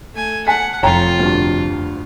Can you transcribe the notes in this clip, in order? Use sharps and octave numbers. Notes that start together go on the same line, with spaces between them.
A3 G#5
F#5 G#5 A5 B6
F1 F2 F4 C#5 G5 A#5
D2 G2